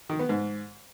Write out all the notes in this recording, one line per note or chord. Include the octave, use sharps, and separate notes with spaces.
D#3
B3
G#2